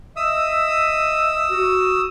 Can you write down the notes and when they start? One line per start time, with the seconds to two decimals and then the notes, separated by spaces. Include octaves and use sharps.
0.16 D#5 E5 D#6 E6
1.51 F#4